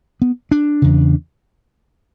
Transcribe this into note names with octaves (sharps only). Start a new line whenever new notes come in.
B3
D4
E2 C#3